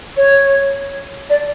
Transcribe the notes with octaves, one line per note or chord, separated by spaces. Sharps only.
C#5
D5